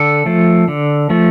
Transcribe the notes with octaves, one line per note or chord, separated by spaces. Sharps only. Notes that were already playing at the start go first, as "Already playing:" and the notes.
Already playing: D3 A4
F3 A3
D3
F3 A3